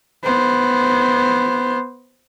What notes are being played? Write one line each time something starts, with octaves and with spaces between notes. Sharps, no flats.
B3 C5